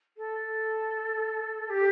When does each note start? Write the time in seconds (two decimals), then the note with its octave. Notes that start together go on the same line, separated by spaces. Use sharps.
0.17 A4
1.69 G4